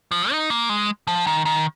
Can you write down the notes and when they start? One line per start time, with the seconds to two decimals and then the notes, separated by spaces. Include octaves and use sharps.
0.12 F3
0.31 D#4
0.50 A#3
0.69 G#3
1.07 F3
1.27 D#3
1.45 D#3